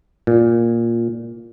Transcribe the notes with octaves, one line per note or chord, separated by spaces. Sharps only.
A#2